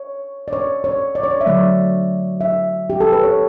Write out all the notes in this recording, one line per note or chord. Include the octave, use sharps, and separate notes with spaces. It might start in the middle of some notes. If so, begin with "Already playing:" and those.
Already playing: C#5
D5
C#5
C#5
D5
C#5
D5
E5
D3 F#3 A3 D5
E5
G4
A4
B4
C#5